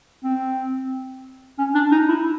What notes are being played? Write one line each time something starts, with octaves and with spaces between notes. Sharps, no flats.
C4
C#4
D4
D#4
E4